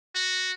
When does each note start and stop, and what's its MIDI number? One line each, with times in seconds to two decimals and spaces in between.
0.15 0.52 66